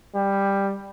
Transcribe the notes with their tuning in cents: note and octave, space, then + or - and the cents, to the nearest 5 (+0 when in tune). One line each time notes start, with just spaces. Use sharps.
G3 +10